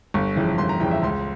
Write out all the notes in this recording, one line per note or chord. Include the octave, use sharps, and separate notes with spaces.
G1 C#6
F2 C#3 E3
G1 C6
A#5
F2 C#3 E3 G5
E5
C#2 C6